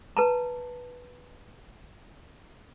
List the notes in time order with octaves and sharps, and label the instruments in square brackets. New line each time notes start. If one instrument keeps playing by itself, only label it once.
[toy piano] B4 A5 A#5